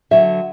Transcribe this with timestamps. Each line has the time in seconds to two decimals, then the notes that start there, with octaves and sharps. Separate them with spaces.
0.11 D3 F#3 E5